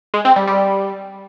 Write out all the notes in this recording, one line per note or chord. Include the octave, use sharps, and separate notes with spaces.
G#3
C4
G3
G3